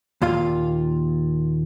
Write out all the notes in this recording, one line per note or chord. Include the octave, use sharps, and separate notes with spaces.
D#2 A#2 F4 F5